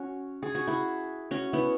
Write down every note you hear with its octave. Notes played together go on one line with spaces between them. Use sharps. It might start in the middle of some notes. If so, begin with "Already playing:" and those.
Already playing: C#4 F#4
G#4
F#4
E4 G#4
C#4 F#4
B3 E4